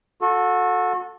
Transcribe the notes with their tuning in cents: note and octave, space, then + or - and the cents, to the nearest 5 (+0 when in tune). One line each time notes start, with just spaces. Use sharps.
F#4 -30 A4 +0